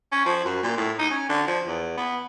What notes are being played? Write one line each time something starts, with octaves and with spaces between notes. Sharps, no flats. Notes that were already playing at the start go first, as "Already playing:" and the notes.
C#4
F3
F#2
A#2
A2
D#4
C#4
D3
F3
E2
B3